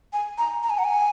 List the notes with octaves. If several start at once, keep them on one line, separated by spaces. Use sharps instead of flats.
G#5
A#5
A#5
G#5
F#5
G#5